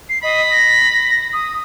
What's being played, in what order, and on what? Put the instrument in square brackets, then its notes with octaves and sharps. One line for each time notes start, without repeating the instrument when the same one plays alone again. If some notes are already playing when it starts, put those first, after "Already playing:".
[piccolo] C7
[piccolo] D#5 [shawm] B5
[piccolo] A#6
D#6